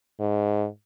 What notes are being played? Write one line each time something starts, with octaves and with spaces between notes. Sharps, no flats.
G#2